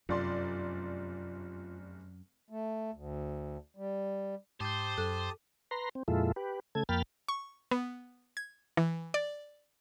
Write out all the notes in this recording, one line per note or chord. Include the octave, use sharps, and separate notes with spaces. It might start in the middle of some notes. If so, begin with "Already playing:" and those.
F1 F#2 F4 D5 C6
A3
D2
G3
G#2 G4 C5 A5 D#6 G6
F#2 A4
B4 A#5 C6
C4
F2 A#2 G#3 E4 F4 A4
G4 B4
C#3 A3 A4 G#6
F2 A#3 G5 B5 F6 A6
C#6
B3
G#6
E3
D5